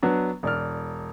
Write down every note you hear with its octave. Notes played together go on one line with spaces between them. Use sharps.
F#3 B3 D4
E1 D5 F6